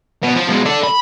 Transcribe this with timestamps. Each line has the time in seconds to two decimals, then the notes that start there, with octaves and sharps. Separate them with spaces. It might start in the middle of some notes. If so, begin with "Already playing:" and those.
0.23 B2
0.35 F3
0.48 B2 G#3
0.65 A4 D5
0.83 B5